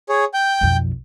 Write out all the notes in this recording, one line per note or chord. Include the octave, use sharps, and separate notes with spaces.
G#4 C#5
G5 G6
B1 F2